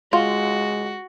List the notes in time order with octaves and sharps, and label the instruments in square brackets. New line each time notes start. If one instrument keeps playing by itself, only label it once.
[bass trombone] G#3 [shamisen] F4 [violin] F#4